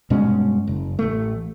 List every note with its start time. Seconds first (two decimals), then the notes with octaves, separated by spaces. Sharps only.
0.10 G2 B2 G#3 C#4
0.67 F#1
0.99 A1 A3